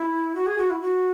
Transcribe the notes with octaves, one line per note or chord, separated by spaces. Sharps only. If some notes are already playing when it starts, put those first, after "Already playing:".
Already playing: E4
F#4
G#4
F#4
E4
F#4